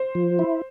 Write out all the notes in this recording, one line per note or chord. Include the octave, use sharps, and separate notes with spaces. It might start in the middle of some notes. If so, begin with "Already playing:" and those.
Already playing: C5
F3
E4